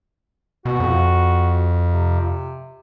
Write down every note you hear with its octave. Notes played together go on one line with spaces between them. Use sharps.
B2 F#4
F2
C3